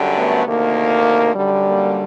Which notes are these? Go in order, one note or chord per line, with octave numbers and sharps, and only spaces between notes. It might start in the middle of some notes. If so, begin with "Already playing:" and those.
Already playing: F#2 D3 G3
A3 B3
D2 C3 D#3 A#3
F#2 D3 G3
A#3